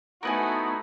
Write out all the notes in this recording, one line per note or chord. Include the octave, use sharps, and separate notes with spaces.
A3 B3 D#4 E4 F#4 A#4 B4 G#5